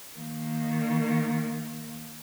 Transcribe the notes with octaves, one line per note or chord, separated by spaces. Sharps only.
D#3 A#3